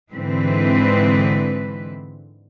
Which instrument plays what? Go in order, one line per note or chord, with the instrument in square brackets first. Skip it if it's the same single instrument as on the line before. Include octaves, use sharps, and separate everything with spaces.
[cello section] G#2 D3 E3 G#3 C4 B4